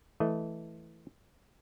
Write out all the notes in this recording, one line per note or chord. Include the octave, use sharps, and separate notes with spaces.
E3 A3 D#5